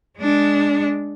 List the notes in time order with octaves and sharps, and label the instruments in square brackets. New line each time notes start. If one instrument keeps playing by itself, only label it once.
[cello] G#3 D4